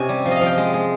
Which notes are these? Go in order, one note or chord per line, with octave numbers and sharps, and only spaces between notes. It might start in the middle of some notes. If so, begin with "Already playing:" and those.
Already playing: C3 C#4 D#5 G#5
G3
F3
D#5 F5
F3
G5
G#3
G#3